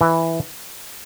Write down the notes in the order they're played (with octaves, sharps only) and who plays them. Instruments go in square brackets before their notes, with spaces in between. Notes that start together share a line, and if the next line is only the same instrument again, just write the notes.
[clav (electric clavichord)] E3